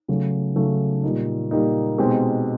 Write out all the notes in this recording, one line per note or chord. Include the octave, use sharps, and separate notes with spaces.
C#3 F#3 A3
C#3 F#3 A3
A#2 G3 A#3 D#4
A#2 G3 A#3 D#4
B2 G#3 C4 D#4 G4